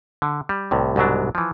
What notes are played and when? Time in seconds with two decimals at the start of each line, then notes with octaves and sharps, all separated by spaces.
0.22 D3
0.49 G3
0.71 C2 A2 C3
0.96 C2 G#2 B2 F#3 D4
1.35 E3 F3